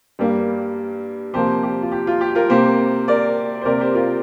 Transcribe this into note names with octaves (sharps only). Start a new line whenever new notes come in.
G2 G3 A#3
C3 F3 A#3 G4 C5
G4
F4
G4
F4
G4
F4 A#4
C3 A#3 G4 C5
A#4 D5
C5
C3 A#3 A#4 D5
G4 C5
F4 A#4